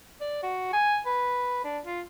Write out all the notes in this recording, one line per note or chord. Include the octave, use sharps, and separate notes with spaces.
D5
F#4
G#5
B4
D4
F4